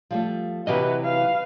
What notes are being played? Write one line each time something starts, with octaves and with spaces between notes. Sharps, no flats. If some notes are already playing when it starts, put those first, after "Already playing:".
F3 G3 A3
C3 E3 F#3 F#4 G4 B4 D#5
B4 F5